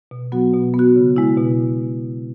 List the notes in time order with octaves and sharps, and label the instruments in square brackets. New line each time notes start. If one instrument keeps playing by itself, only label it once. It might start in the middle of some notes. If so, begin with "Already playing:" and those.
[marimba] B2
F#3 B3 F#4
B2
B3
F#4
C#3
G#3 E4
B2